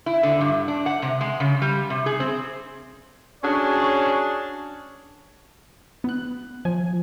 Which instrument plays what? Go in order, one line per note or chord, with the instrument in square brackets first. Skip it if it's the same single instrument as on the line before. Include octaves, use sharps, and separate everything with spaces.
[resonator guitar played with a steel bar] E4
D3
G2
D4
F#5
C3
G#3
C#3
G3
C3
G#4
C4
[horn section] C#4 D4 F#4 G#4 C#5
[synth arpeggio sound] B3 F#6
[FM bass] F3 [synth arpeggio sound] G#5